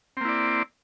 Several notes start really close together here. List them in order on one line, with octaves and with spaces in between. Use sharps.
C4 A#3 E4 D5